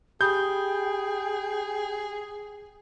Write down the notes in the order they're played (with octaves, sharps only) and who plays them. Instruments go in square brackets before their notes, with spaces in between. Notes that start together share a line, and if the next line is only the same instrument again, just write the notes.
[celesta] G4 B5 D#6 [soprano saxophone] G#4 [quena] G5 [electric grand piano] G6